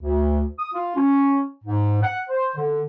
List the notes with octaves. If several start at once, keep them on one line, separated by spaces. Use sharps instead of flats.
D2
D#6
F4
C#4
G#2
F#5
C5
D3